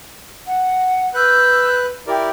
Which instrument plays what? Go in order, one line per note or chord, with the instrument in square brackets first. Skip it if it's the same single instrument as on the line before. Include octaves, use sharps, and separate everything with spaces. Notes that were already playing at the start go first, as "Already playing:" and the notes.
[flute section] F#5
[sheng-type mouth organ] B4 F#6 [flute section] E6 G6
[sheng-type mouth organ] E4 A#4 D5 [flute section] G4